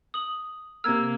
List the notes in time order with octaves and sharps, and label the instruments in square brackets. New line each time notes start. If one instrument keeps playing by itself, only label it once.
[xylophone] D#6 F#7
[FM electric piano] C3 F6 [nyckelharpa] A#3 [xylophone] E6 G#6